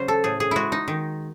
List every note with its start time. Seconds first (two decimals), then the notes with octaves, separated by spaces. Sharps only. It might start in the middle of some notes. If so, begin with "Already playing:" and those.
Already playing: C#3 F#3 C5
0.08 A4
0.24 A2 G#4
0.40 G#4
0.51 G#3 E4 F#4
0.72 D#4
0.88 D#3